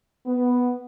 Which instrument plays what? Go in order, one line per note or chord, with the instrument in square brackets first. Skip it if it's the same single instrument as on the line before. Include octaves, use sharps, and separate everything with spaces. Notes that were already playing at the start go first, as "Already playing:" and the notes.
[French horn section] B3